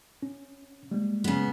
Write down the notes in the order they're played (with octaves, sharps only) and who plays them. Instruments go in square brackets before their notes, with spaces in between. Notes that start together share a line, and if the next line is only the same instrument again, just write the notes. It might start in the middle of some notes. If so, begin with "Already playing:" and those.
[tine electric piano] C#4
G3 G#3 A#3
[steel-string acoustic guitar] C#3 B3